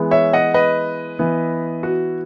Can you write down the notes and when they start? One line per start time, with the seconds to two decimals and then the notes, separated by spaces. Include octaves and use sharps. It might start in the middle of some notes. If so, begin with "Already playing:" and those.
Already playing: E3 G#3 B3 E4
0.11 C#5 E5
0.33 D#5 F#5
0.54 B4 D#5
1.19 E3 B3 E4
1.83 F#4